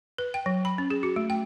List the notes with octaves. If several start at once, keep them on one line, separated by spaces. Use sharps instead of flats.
B4
G5
F#3
B5
C#4
G#4
F#4
A3
G5